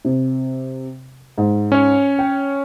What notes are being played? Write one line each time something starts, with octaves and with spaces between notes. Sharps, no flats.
C3
G#2
C#4 C#5
G5